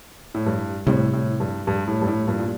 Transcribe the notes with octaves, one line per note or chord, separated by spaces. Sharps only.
A2
G2
A2 C3 G3 C4
A2
G2
G2
A2
G2
A2
G2 A#2
A#2